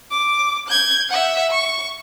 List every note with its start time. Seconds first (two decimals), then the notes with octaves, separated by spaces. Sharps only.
0.11 D6
0.68 G6 G#6
1.09 E5 F#5
1.52 C#6